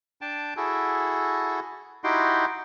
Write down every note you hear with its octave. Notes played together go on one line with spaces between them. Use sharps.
D4 G5 A5
E4 F#4 G#4 A4
D#4 E4 F#4 G4 G5 C6